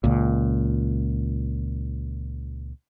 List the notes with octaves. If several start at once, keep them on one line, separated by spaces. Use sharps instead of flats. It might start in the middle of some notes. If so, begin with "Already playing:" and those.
C#2 A#2